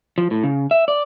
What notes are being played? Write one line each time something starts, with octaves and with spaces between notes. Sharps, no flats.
F3
A2
C#3
E5
D5